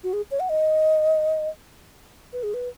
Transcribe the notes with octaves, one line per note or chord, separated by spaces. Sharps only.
F#4
G#4
C#5
F#5
D#5
B4
G#4
B4